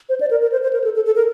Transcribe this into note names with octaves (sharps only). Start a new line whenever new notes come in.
C5
D5
A#4
A#4
C5
C5
A#4
A4
A4
A4
A#4